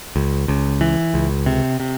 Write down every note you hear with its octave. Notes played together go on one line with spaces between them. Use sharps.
C#2
C#2
E3
C#2
C3
C3